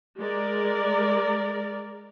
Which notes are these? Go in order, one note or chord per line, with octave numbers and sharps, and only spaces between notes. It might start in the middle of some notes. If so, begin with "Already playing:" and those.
G#3 A#4 D5